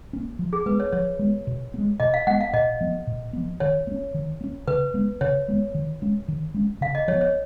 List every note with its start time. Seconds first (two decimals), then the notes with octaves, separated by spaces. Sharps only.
0.13 A#3 C#4
0.39 F3
0.53 G#4
0.66 G#3 B3 B4
0.80 C#5
0.92 F3 C#5
1.19 G#3 B3
1.47 B2
1.74 B3
1.78 G#3
2.00 B2 D#5
2.14 F5
2.27 G#3 F#5
2.30 B3
2.40 F5
2.53 A#2 D#5
2.81 F3 B3
3.07 A#2
3.33 F3 B3
3.60 D#3 C#5
3.87 A#3
3.92 C#4
4.14 D#3
4.41 A#3
4.44 C#4
4.67 C#3 B4
4.94 G#3 B3
5.21 C#3 C#5
5.48 G#3 B3
5.75 D#3
6.02 G#3 C#4
6.28 D#3
6.54 G#3 C#4
6.81 C#3 F5
6.95 D#5
7.08 F3 C#5
7.13 B3
7.21 C#5